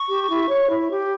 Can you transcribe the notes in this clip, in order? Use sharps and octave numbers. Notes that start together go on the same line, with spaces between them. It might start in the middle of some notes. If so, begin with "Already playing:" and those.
Already playing: C#6
G4
E4
C#5
E4
G4